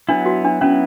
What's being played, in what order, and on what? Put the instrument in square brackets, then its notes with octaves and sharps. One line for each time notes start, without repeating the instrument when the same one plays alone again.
[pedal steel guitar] F#3 B3 E4 [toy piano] D4
[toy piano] F#4
D4
[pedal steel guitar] F#3 B3 E4 [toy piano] C#4